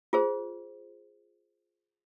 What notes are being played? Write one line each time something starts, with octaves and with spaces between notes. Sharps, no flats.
F4 G#4 C5